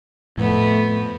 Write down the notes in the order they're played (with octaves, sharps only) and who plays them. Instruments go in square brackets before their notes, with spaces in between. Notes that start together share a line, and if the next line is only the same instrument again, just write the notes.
[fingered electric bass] F2 [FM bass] A2 [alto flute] A3 [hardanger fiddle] B3